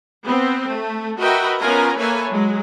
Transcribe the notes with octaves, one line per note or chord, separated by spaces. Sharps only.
B3 C4
A3
F#4 A#4 B4 D#5 E5 G5
B3 C#4 F4 A#4 G#5 A#5
A#3 A4 B4 C#5 E5 G#5
F#3 G#3